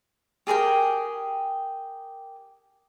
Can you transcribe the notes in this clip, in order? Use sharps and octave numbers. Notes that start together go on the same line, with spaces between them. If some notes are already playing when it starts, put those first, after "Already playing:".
G4 G#4 A#4 G5